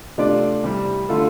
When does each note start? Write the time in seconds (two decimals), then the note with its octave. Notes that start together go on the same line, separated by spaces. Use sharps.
0.18 C3 A3 D4 F4 D5
0.63 C2 C3 G3
1.09 D3 A3 F4 A4